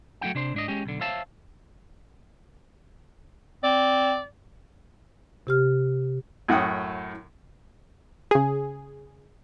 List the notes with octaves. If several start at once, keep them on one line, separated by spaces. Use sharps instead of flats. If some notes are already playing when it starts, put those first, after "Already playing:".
F#3 A3 D#4 F#5 G5
C3 D4 C5
G#2 D4 D#5
G#3 C#4 G4
B1 D3
C5 C#5 E5 F5 A5
C4 D5
C3 G4 F6
F#2 A2 F#5 G5 D#6
C#3 G#4